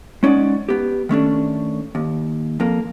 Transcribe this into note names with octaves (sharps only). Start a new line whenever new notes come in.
G#3 C#4 D#4 D5 F#5
B3 G4
D#3 A3 C#4 D4
D#2
F2 A#3